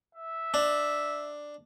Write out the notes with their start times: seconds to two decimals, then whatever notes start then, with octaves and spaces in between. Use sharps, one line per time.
0.15 E5
0.54 D4